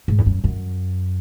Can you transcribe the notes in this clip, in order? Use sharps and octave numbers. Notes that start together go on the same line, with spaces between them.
G#2
E2
F#2
F#2